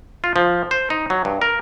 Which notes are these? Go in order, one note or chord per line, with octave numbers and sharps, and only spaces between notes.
F4
F3
C5
D#4
F#3
G2
A#4